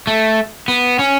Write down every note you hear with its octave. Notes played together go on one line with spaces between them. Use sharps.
A3
B3
C#4